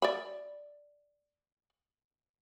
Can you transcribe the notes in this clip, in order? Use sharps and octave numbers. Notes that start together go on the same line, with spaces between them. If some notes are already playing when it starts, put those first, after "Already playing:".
D5 E5 B5